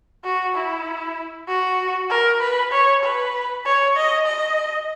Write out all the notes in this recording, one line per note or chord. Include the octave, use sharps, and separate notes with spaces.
F#4
E4
F#4
A#4
B4
C#5
B4
C#5
D#5
D#5